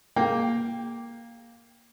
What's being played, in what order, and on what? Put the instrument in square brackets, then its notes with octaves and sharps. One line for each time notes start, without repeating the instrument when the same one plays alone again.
[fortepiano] A#3 G5